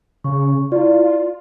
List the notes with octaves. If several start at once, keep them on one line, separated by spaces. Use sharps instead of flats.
C#3 C#6
E4 F4 D5